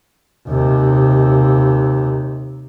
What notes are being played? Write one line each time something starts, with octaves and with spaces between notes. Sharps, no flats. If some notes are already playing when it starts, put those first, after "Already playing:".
D#2 C3